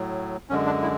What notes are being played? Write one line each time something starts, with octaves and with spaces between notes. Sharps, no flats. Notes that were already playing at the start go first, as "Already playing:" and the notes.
Already playing: A2 F#3
F#2 D3 G#3 C#4
D4
E4